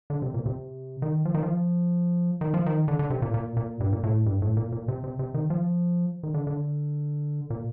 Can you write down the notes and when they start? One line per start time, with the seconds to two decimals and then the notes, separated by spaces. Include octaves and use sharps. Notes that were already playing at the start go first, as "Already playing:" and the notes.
0.10 D3
0.22 C3
0.34 A#2
0.46 C3
1.02 D#3
1.25 F3
1.34 D#3
1.43 F3
2.41 D#3
2.54 F3
2.66 D#3
2.88 D3
2.99 D3
3.10 C3
3.22 A#2
3.34 A#2
3.57 A#2
3.80 G2
3.93 A#2
4.03 A2
4.26 G2
4.42 A2
4.57 A#2
4.72 A#2
4.88 C3
5.04 C3
5.19 C3
5.34 D#3
5.50 F3
6.23 D#3
6.34 D3
6.47 D3
7.50 A#2